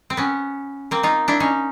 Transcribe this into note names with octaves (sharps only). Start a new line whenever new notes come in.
C4
B3 C#4
A#3 C4
D#4 F4
D4 E4
C#4 D#4